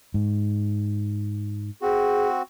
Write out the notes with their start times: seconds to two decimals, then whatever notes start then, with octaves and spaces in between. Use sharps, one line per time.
0.14 G#2
1.82 C4 F#4 G#4